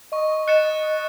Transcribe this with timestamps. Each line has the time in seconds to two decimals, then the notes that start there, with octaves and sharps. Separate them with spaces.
0.12 D#5 C#6
0.47 F#6 A6 C#7 E7